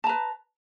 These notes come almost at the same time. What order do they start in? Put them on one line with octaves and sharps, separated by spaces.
A5 A#5 B4